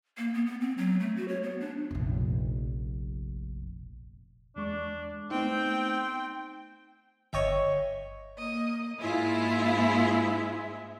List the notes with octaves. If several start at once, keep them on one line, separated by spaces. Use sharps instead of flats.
A#3
B3
B3
C4
F#3
A3
F#4
C#5
B3
D4
F1 A#1
E2 G#3 D4 C#6
A3 B3 C4 D#4 G5
G1 C#5 D#5 E5 G5 C#6
A#3 D#5
G#2 G#3 A#3 E4 F4 E5